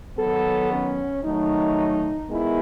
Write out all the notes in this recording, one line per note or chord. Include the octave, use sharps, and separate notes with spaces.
D#3 F#3 B3 A4
C#4
D#3 F#3 A3 D#4
D#3 G#3 B3 E4